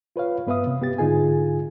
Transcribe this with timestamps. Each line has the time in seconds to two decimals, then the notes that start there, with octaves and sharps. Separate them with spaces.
0.16 F4 B4 C#5 F5
0.47 G2 B3 B4 E5 F5 D#6
0.67 C3
0.81 B3 G4 A6
0.98 G#2 D3 D#4 F4 G#4 G#5